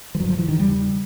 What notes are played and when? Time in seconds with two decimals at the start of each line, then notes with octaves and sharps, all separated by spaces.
0.15 F3
0.19 G2 D3 F#3
0.29 F3
0.38 E3
0.48 D#3
0.58 E2 C#3 G3